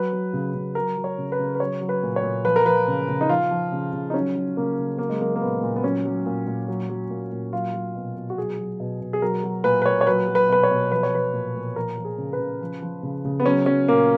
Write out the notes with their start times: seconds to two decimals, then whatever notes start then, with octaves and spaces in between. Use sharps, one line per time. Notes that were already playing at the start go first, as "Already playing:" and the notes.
Already playing: F#3 B4
0.13 F#3
0.33 C#3
0.54 C#3
0.75 F#3 A#4
0.97 F#3
1.04 C#5
1.18 C#3
1.32 B4
1.39 C#3
1.55 B4
1.60 F#3 C#5
1.81 F#3
1.89 B4
2.03 A#2
2.16 C#5
2.23 A#2
2.45 F3 B4
2.56 A#4
2.66 F3 B4
2.88 C#3
3.09 C#3
3.21 D#4
3.29 F3 F4
3.51 F3
3.72 C#3
3.93 C#3
4.10 D#4
4.14 F#3 C#4
4.36 F#3
4.57 C#3 A#3
4.78 C#3
4.98 F#3 A#3
5.10 G#3
5.20 F#3 A#3
5.35 A#3
5.41 A#2 B3
5.63 A#2
5.76 B3
5.83 F#3 C#4
6.05 F#3
6.26 A#2
6.47 A#2
6.68 F#3
6.90 F#3
7.10 A#2
7.32 A#2
7.53 F#3 F4
7.74 F#3
7.95 B2
8.16 B2
8.30 F#4
8.37 F#3 G#4
8.59 F#3
8.80 B2
9.01 B2
9.13 G#4
9.22 F#3 A#4
9.44 F#3
9.64 A#2 B4
9.82 B4
9.86 A#2 C#5
10.01 C#5
10.07 F#3 B4
10.28 F#3
10.35 B4
10.49 B2 B4
10.63 C#5
10.71 B2
10.92 F3 B4
11.03 C#5
11.13 F3 B4
11.33 A#2
11.56 A#2
11.76 F3 A#4
11.98 F3
12.05 G#4
12.18 C#3
12.33 B4
12.40 C#3
12.62 F3
12.82 F3
13.03 C#3
13.25 C#3
13.40 B3
13.45 F#3 C#4
13.66 F#3 C#4
13.88 A#2 A#3